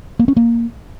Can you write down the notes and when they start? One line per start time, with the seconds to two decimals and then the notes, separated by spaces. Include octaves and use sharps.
0.19 A#3
0.28 C#4
0.37 A#3